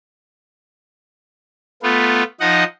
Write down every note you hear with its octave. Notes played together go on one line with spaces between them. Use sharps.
A3 B3 F4
F3 D#4 D#5 F#5